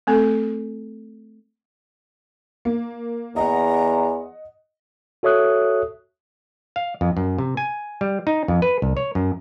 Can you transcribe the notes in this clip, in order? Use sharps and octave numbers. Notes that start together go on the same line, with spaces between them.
A3 C4 A4
A#3
E2 D#5 F#5 A#5
F#4 A4 C#5 E5 D#6 F#6
F5
F2
F#2
C3
G#5
G3
D#4
F2
B4
C2
C#5
F#2